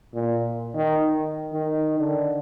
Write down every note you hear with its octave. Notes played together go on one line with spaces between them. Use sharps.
A#2
D#3
D#3
D3